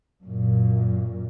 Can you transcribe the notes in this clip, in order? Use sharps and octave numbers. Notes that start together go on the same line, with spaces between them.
F#2 A#2